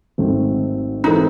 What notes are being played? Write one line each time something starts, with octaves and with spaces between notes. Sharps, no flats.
G#1 G#2 F#3 A3 C4
G#2 E3 C4 D#4 E4 A4